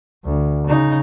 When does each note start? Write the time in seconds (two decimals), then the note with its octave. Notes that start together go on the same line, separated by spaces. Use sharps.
0.24 D2
0.67 C#3 D#4